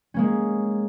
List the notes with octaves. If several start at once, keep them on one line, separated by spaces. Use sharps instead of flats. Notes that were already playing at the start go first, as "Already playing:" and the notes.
G#3 A#3 C#4